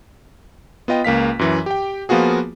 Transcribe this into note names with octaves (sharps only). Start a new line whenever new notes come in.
B3 F4 D#5 G5
C#2 A#3 F5 B6
F#2 E3
G4 G5
F3 A#3 B3 F4 F#4 G#4